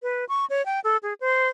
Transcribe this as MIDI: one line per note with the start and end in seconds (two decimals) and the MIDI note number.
0.03 0.25 71
0.29 0.45 85
0.50 0.65 73
0.66 0.80 79
0.84 0.97 69
1.03 1.14 68
1.21 1.48 72